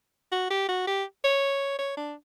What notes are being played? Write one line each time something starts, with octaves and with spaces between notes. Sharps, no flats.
F#4
G4
F#4
G4
C#5
C#5
D4